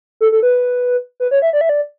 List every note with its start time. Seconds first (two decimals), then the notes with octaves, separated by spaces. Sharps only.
0.21 A4
0.32 A4
0.43 B4
1.20 B4
1.31 C#5
1.42 E5
1.53 D5
1.61 E5
1.69 D5